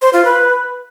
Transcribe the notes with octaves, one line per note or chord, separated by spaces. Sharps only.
C5
F4
B4